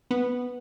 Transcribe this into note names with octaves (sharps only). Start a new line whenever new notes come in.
B3